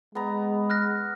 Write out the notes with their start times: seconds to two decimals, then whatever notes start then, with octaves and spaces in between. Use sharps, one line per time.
0.15 G#3 B3 A#5
0.70 F6 F#6 A#6